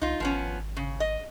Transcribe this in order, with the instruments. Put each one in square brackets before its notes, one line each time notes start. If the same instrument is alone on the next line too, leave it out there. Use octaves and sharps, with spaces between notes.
[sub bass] C2 [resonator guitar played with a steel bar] D#4 F4
[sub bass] G#1 [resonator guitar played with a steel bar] F3 B3 C#4
[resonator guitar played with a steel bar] C#3
D#5